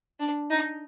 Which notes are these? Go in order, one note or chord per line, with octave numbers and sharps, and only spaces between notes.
D4
D#4